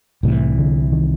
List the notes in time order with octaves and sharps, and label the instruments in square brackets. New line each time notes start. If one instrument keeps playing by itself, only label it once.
[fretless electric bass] C2 C3 E3 [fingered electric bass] A2
[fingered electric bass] D3
D#3